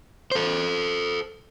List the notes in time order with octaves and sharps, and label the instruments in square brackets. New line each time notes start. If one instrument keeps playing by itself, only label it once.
[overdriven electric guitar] A4 C5